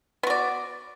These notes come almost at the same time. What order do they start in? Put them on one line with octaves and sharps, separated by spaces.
B3 F#4 D5